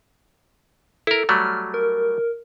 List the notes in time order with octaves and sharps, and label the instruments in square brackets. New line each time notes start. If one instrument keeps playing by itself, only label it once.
[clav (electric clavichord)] E4 A#4 [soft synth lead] A4
[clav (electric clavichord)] F#3 G3 A3 [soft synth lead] F6
[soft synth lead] A#4